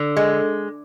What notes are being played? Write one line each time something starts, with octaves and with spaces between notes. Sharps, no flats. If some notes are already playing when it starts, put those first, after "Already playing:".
Already playing: D3
G#3